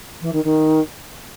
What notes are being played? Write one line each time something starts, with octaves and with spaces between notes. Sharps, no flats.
E3
D#3
D#3